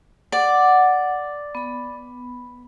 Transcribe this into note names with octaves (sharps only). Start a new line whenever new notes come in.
D5 F#5
B3 B5